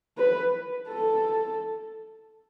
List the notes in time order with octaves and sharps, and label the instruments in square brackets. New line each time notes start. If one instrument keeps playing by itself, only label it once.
[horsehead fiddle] B4
A4